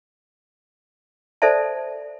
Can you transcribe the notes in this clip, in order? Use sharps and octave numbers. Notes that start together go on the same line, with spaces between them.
A4 C5 D5 E5 A5